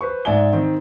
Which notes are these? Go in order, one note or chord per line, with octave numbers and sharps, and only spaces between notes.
B4 C5 C#6
G#2 D5 E5 G#5 G7
D#3 C4